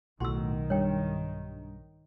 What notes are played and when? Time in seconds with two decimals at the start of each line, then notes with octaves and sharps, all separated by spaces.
0.20 B1 A2 D#3 F#4 C6 E6
0.70 G2 C#5 G5